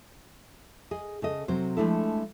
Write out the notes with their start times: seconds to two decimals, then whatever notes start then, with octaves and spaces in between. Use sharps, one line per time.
0.91 G#4 D#5
1.22 C#3 A4 D#5
1.48 C3 F#3 C5
1.77 F3 G#3 A3 D4 E4 A4